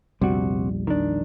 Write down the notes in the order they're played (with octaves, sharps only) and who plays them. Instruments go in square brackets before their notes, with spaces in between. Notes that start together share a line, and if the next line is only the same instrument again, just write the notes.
[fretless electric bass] A#1 E2 G3 [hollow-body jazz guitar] C3 F#4
[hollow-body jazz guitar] D#3 D4